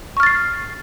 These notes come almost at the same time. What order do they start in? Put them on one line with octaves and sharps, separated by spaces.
C#6 F6 A6 C7